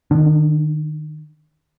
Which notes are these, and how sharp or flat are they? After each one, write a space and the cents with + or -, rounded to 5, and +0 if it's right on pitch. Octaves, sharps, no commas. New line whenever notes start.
D#3 -25 D4 +5